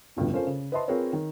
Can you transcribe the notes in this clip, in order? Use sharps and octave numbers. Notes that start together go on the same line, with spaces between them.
F1 C#2 G2 B2
C#4 F4 A4 A#4 C5 F5
C#3
B4 C5 D#5 E5 A5 C6
C4 F4 G#4 A#4 B4 C#5
D#3